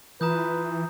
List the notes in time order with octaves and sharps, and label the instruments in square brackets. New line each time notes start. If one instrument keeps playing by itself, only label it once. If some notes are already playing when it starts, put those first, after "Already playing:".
[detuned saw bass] E3 [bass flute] F4 [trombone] B4 [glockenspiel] A#5 D#6 G6